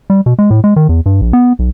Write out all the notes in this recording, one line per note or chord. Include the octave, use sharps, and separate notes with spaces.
G3
B2
G#3
A2
G#3
D#3
E2
G2
A#1
B3
B1